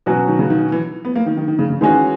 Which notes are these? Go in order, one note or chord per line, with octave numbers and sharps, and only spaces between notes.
B2 E3 F#3 C#4 F#4
D#3
C#3
D#3
E3
B3
A#3
D#3
D#3
D#3
C#3
C#3
D#3 E3 G#3 C#4 F#4